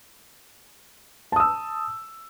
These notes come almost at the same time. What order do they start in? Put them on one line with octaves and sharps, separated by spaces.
A5 D#6 E6